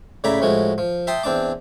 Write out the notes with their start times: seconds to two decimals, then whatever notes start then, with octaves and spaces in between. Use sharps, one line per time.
0.24 A2 C#3 D5 E5 A#5 B5
0.41 A2 F3 G#3 F#4
0.78 F3
1.07 E5 G5 A5 C6 D#6
1.23 E2 C4 D4 A5 D6